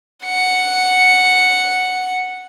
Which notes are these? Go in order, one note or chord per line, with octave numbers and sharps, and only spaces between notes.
F#5 C#7